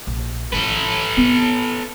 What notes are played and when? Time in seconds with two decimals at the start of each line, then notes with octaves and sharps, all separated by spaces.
0.07 A#1
0.53 A1 F3 A4 B4
1.17 B3